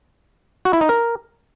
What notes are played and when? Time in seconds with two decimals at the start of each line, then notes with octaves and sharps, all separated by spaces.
0.65 F#4
0.73 E4
0.81 D#4
0.89 A#4